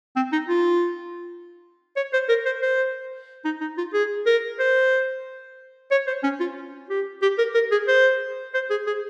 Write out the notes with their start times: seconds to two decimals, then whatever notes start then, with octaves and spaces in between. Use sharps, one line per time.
0.16 C4
0.32 D#4
0.49 F4
1.97 C#5
2.13 C5
2.29 A#4
2.46 C5
2.62 C5
3.45 D#4
3.61 D#4
3.78 F4
3.94 G#4
4.26 A#4
4.59 C5
5.91 C#5
6.07 C5
6.23 C#4
6.40 F4
6.90 G4
7.22 G4
7.38 A#4
7.55 A#4
7.71 G#4
7.88 C5
8.54 C5
8.70 G#4
8.87 G#4